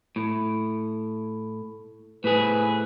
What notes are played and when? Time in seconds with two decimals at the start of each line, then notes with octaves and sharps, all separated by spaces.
0.16 A2
2.24 A2 G#4 B4